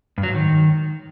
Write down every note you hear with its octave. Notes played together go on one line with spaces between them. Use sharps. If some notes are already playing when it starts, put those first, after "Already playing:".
G2
F#3
G#2
D#3